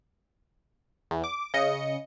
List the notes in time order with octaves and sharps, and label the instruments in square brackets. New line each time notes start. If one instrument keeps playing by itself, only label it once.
[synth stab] E2
D6
C#3 D#5 C#7